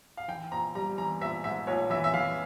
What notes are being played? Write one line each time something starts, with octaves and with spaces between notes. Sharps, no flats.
F5
E3 G5
A#1 A#5
G3 A#5
E3 A#5
A#1 E5
G#2 E5
A#1 C#5
E3 E5
E5
E3 F5